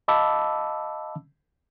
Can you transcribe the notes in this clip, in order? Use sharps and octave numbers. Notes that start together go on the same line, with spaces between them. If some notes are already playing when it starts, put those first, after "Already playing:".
D#5 F5 A5 B5 D6 E6